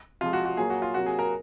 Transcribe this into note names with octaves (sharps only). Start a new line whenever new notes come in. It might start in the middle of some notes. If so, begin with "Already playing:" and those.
C3 F3 G#3 F4
F#4
F#4
A#2 F#3 A#3 G#4
F#4
F4
C3 F#3 A#3 F#4
G#4
A#4